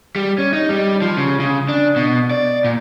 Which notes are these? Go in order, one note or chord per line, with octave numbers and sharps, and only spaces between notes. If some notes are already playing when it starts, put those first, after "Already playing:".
G3
C#4
D#4
G3
F3
C#3
C#3
D4
B2
D5
A#2